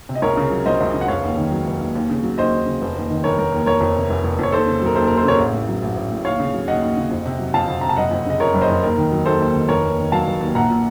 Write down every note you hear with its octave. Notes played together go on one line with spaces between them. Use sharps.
C3
D#5
C#2 A#4 C#5
C#3
F#3
C#2 C5 D#5
C#2
C#3
F#5
F1 C#5 F5
D#2
D#3
F#3
F1
D#2
D#2
C#3
F#3
D#2 C5 D#5
D#2
C#3
F1
D#2
D#3
F1 A#4 C#5
F1 A#4
D#2
F1 A#4 C#5
F2
C3
F1
F1
F2 C#5
D#2 A4 C5
C#3
F#3 A#4
D#2 A4 C5
D#2 A#4
A4 C5
C#3 A#4 C#5
A1
A2
F#3
A1
A1
A2
D#2 C#5 F5
C#3
F#3
D#2 D#5 F#5
D#2
C#3
F2
C3
F#3
F2 F5 A5
F2
C3 A#5
A5
F#1 D#5 F#5
F2
C#3 D#5
F3 A#4 C#5
F#1
C5 D#5
F2
D#2 A#4
D#3
F#3
D#2 A4 C5
D#2
D#3
F1 A#4 C#5
D#2
D#3
F#3 F5 A5
F1
D#2
A#1 F#5 A#5
A#2